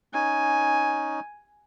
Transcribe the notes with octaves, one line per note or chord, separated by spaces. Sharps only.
C#4 D#4 G#5